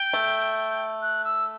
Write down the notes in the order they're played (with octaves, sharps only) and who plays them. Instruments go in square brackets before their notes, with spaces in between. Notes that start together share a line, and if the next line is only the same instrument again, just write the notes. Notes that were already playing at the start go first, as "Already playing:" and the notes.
Already playing: [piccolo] G5
[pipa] A3
[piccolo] F#6
E6